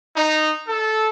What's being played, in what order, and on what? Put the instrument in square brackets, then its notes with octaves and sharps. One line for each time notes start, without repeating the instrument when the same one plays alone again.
[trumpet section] D#4
A4